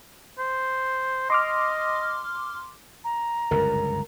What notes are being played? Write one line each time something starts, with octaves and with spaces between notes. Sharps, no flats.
C5
D#5 C6 D6 F6
A#5
G1 C#2 F#2 A#4